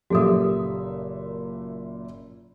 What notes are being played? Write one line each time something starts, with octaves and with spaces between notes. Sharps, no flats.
F#1 A#2 G4 A4 E5 D#6